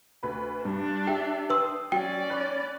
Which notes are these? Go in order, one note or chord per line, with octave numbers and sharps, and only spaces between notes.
D2 B4 B5
G2 D4
G4 E5 G5
B4 G5 C6 D#6 E6
F#3 C#4 D5 G5
C#5 B5 F#6